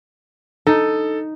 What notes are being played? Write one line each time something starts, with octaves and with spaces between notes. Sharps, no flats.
D#4 A4